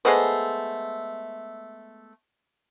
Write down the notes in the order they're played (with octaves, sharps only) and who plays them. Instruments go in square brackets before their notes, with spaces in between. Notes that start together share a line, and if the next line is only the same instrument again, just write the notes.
[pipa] G#3 A3 B3 C5